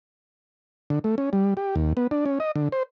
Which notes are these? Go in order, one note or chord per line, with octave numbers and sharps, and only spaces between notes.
D3
A3
C#4
G3
G4
D#2
B3
D4
C#4
D#5
D3
C5